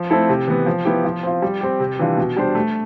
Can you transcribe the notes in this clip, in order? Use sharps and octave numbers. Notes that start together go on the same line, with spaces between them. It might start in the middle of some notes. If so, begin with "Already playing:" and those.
Already playing: F3
A3 C4 E4 A4
C3
E3 B3
F3
B3 E4 G4
F3
C4 F4
G3
C4 G4
C3
E3 G3 D4 F4
B2
G3 D4 G4 C5
A3